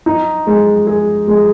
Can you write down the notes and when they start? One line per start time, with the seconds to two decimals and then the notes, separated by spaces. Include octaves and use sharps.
0.06 D#4
0.47 G#3
0.87 G#4
1.28 G#3